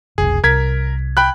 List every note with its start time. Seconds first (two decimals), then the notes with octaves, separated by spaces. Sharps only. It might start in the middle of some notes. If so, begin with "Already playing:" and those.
0.18 F1 B1 G#4
0.44 C2 A#4 G#6 B6
1.17 G5 B5 F#6